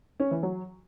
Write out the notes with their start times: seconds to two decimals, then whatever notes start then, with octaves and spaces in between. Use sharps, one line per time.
0.20 C#4
0.31 E3
0.43 F#3